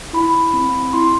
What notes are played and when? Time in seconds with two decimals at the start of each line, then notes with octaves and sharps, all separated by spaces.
0.13 E4 B5
0.53 C4
0.93 E4 C6